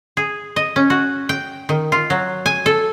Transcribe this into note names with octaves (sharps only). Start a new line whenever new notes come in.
G#4
D#5
C#4
F#4
G5
D#3
F4
F#3
G#5
A4